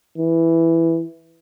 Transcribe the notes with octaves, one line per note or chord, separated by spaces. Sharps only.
E3